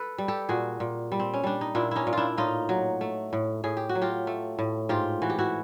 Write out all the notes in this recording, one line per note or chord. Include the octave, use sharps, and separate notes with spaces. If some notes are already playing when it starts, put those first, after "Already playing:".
Already playing: A4 B4
G3
G4 A4
A#2 F#4 G#4
A#2
G3
C4
C#4
G3 D4
D#4
A#2 D4 E4
C#4 D#4 E4
A#2
D4 E4 F4
A2 D#4 F4
F#3
A3
A2
A2 G#4
G4
F#4
F#3
F4 G4
A3
A2
G#2 F4 G4
E3 F#4
G4
E4 F#4